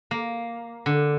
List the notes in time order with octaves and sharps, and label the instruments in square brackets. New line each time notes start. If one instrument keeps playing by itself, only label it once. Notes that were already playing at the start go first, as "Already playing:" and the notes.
[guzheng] A#3
D3